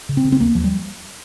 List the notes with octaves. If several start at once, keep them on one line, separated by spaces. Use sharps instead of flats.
C#3
C4
C#3
C4
D#2 A#3
D#2 F3
G3